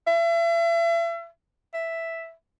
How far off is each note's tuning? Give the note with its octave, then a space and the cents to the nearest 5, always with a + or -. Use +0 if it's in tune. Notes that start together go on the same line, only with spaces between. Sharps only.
E5 +35
E5 +0